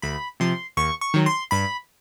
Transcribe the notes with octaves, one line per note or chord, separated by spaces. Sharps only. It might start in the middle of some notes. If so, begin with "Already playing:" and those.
D2 B5
C3 F3 C6
D#2 C#6
C#6
D#3 F#3
C6
G2 B5